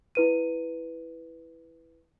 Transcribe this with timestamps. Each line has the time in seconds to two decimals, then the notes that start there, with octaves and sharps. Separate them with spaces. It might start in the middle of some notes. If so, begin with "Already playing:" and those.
0.15 E4 B4 D#7